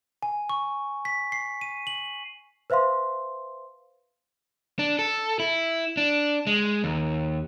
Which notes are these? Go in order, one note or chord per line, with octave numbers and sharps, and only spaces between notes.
G#5
C#6
B6
C7
D#7
F#7
B4 C5 E5 F5 C6
D4
A4
E4
D4
G#3
D#2